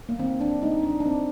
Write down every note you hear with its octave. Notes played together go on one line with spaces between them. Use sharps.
A#3
D#3 C4
D4
G3 A#3 D#4
D4
D4
D3 C4